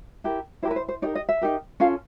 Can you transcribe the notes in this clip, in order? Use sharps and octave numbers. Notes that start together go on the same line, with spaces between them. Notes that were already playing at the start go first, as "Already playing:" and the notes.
E4 G4 A#4
E4 G4 A#4 C5
B4
C5
C5
D#4 G4 A#4 D5
D#5
E5
D#4 G4 A#4
C#4 F4 A4 F5